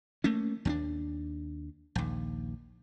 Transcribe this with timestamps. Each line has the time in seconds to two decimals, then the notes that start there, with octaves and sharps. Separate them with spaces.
0.24 A3 A#3 C#4
0.65 D#2 C4 D4
1.95 A#1 D#2